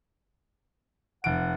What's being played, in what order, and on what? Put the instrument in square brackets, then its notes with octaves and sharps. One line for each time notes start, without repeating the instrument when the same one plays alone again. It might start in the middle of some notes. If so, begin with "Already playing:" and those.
[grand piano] F1 D7 [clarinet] F#5